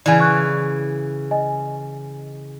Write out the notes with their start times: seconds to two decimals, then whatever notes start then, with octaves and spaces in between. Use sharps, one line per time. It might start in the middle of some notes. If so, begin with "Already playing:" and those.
0.06 C#3 E3 D5 G#5
0.20 C#6 F#6
1.31 D#5 G#5